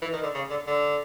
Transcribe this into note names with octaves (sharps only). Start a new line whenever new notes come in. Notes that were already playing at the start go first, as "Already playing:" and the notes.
E3
D#3
D3
C#3
D3
D3